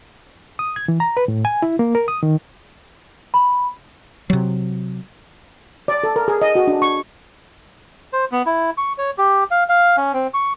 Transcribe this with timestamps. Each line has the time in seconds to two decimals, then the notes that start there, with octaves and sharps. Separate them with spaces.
0.59 D#6
0.76 G#6
0.88 E3
1.00 A#5
1.17 B4
1.28 A2
1.45 G#5
1.62 E4
1.79 A#3
1.95 A#4
2.08 D#6
2.23 D#3
3.34 B5
4.30 C3 F#3
5.88 D5
6.03 A4
6.16 A#4
6.28 G#4
6.42 D#5
6.55 F#4
6.67 D4
6.82 C#6
8.13 C5
8.32 B3
8.46 E4
8.78 C#6
8.98 C#5
9.18 G4
9.51 F5
9.69 F5
9.97 C#4
10.13 C4
10.34 C#6